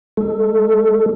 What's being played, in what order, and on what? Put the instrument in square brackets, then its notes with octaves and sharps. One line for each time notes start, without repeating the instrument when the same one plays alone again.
[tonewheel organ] G#3 A4